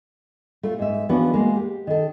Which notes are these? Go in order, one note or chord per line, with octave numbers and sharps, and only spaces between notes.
A3 F4
G#2 E5
E3 F3 B3 C#4 D4 F#4
G#3 A#3 F#4
G4
D#3 A4